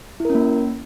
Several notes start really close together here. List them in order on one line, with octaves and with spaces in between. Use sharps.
E4 A#4 C#4 A#3